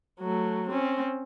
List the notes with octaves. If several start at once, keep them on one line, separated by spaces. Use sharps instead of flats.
F#3 A3
C4 C#4